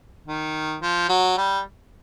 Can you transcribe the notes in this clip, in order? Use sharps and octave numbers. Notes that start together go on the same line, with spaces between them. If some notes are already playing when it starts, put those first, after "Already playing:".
D#3
F3
F#3
G3